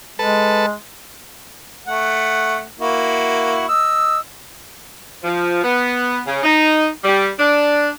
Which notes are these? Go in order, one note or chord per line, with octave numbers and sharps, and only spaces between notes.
G#3 A4 B4 A5
A3 F#5
A#3 E4 F#4
D#5 E6
F3
B3
C#3
D#4
G3
D4